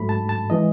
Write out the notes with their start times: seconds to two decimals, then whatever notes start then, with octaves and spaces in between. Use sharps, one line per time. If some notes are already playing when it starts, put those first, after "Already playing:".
Already playing: G#2 F#3 A3 B5
0.09 A5
0.29 A5
0.50 E3 G#3 D#5